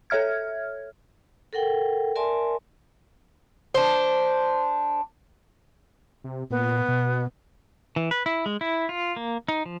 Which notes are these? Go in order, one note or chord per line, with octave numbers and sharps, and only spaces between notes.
A4 C#5 E5 F6 G#6
A4 A#4 F#5 G5
A#4 D5 E5 G#5 A5 C6
D4 C5
C3
A#2 B3
B2
E3
B4
E4
G#3
E4
F4
A#3
D#4
F3